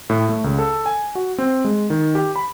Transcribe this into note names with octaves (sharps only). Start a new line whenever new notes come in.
A2
A3
C#2
A4
G#5
F#4
C4
G#3
D#3
G4
B5